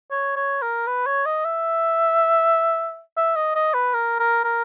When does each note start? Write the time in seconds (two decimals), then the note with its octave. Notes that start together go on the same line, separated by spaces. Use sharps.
0.11 C#5
0.36 C#5
0.62 A#4
0.87 B4
1.06 C#5
1.26 D#5
1.45 E5
3.17 E5
3.36 D#5
3.55 D#5
3.74 B4
3.94 A#4
4.20 A#4
4.44 A#4